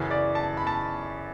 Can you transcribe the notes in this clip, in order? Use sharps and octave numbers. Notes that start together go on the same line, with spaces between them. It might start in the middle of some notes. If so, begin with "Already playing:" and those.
Already playing: F#2 C#3 E3
D5
A5
B5
A5